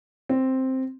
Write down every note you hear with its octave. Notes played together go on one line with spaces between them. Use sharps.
C4